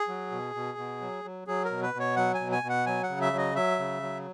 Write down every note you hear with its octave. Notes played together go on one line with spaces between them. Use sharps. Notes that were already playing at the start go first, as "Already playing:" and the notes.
Already playing: G#4
F#3
B2
B2
B2
F#3
F#3
F#3 G#4
A#4
B2
B4
B2
C#5
F#3 F#5
G#5
B2
G#5
B2
F#5
F#3 G#5
F#5
C#3
E5
F#3
D#5
F#3 E5
C#3
F#3